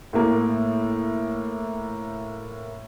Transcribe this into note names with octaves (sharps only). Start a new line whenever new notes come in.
A2 A#3